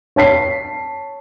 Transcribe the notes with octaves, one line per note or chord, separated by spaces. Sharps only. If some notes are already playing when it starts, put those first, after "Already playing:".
C#5 A5 B6 C7